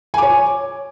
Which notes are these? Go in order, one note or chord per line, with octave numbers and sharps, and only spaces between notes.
C#5 G#5 D6